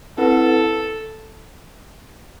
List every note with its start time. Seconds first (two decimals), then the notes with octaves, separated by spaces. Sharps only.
0.18 C4 E4 A4 B4 F#5